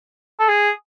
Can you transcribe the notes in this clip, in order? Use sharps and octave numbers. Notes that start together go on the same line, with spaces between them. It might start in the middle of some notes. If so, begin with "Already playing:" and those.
A4
G#4